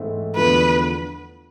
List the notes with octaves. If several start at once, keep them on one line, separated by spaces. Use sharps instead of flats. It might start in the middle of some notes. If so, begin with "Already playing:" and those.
Already playing: G#2 E3 A3 C4 E4
E2 D3 F3 A3 B4